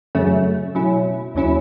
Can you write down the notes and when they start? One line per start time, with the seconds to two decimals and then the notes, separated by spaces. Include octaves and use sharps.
0.15 F#2 C#3 F#3 A3 C#4
0.75 B2 F#3 C#4 E4
1.35 D#2 C#3 F#3 C#4 E4